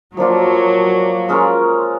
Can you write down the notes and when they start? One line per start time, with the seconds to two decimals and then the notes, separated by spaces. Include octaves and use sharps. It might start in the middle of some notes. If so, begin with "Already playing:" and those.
0.17 F3 F#3 A#3 D4 F4
1.29 G#3 C#4 F4 A#4